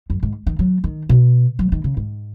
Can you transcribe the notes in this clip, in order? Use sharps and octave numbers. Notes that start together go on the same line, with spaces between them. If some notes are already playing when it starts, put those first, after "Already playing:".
F#2
G#2
D#3
F#3
D#3
B2
F#3
D#3
C#3
G#2